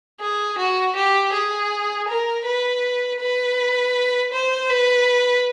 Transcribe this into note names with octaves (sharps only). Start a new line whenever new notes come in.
G#4
F#4
G4
G#4
A#4
B4
B4
C5
B4